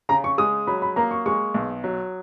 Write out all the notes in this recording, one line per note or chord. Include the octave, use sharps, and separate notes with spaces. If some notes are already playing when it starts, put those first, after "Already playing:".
C#3 A#5
C#6
G#3 D#6
F#3 B5
B5
A#3 A#5
C#6
G#3 C#6
B1
F#3